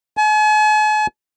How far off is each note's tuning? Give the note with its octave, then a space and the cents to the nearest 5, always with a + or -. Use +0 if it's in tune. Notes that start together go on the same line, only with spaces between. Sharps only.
G#5 +45